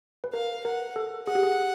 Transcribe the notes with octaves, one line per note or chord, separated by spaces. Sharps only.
B4
A#4 F5
A#4 F#5
A4
G#4 F#5
G4
G#4